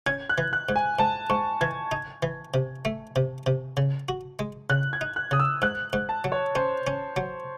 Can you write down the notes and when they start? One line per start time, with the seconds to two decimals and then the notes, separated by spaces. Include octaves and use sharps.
0.06 C#4 G#6
0.29 F#6
0.38 E3
0.53 F#6
0.69 G#2
0.76 G#5
0.99 G#2 A5
1.30 G#2 C#6
1.61 E3 G#6
1.92 D#4
2.23 E3
2.54 C3
2.85 A3
3.16 C3
3.46 C3
3.77 C#3
4.09 F#4
4.39 G#3
4.70 C#3 F#6
4.93 G#6
5.01 D#4
5.16 F#6
5.31 C#3 D#6
5.39 E6
5.62 G#2 F#6
5.93 G#2
6.09 A5
6.24 F#3
6.32 C#5
6.55 C#4 C5
6.87 C#4
7.16 F#3